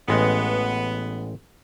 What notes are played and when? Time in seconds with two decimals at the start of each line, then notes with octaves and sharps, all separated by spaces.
0.08 A1 G#3 B3